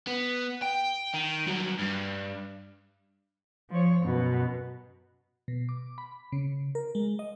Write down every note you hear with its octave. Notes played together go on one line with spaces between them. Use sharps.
B3
G5
D#3
G2 F#3
G2
F3 C#5
F#2 B2
B2
D6
B5
C#3
A#4
G#3
D#5